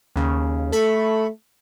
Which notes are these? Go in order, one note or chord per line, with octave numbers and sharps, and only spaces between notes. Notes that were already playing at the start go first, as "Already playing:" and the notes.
D#2 C#3
A3 A4 B5 C#6